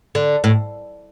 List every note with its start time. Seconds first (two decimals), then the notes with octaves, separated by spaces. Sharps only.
0.15 D3
0.44 A2